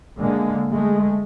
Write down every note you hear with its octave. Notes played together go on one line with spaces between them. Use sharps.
D3 G#3 A#3
G#3 A3